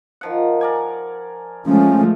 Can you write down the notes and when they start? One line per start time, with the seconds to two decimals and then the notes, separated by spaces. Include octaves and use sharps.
0.21 D#3 F3 F#5
0.61 A#4 D5 G#5
1.66 F3 G#3 A3 C#4